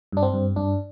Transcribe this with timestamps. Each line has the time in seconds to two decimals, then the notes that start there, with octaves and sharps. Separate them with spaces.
0.12 G2 D4
0.23 C4
0.33 G2
0.56 G2 D4